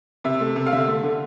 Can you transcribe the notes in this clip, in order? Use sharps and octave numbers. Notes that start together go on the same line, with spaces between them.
C3 E5
A3
C3
F5
D3 E5
A3
D3